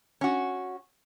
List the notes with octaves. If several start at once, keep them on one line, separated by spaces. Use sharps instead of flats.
C#4 F#4